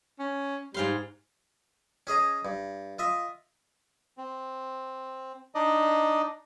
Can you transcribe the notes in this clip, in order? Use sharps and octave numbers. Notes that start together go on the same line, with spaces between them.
C#4
G#2 G3 F5 C6
C#4 G#4 D#5 A#5
G2
F4 D#5 E5
C4
D4 D#4 D5 D#5